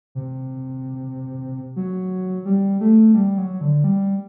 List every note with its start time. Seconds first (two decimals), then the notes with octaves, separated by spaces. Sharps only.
0.15 C3
1.76 F#3
2.45 G3
2.81 A3
3.14 G3
3.38 F#3
3.61 D3
3.84 G3